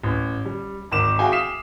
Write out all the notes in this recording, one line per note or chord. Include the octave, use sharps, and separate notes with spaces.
A1
G3
G#1 D#3 D6 E7
F#4 G#4 E5 F5 G5 G#5
D#6 F6 B6 C7 E7